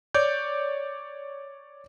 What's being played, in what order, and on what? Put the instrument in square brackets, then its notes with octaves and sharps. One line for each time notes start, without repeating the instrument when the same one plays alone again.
[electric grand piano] C#5 D5 D6 G6